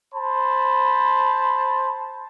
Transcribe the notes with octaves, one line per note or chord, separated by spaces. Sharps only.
C5 A5 B5